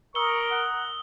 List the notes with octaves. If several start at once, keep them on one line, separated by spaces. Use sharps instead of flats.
A#4 C#6 D#6 E6 G7
F#5